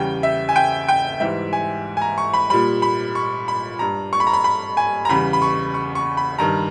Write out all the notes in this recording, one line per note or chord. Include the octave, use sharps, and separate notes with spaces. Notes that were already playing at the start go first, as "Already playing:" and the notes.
Already playing: E2 C#3 G3 G5
E5
G#5
G5
G5
G#2 E3 G3 E5
G#5
G#5
A#5
C#6
B5
A#2 G3 B5
B5
C#6
B5
G2 G3 A#5
C#6
B5
A#5
B5
B5
G#5
A#5
E2 C#3 G3 B5
B5
C#6
C#6
C#6
B5
G2 D#3 G3 A#5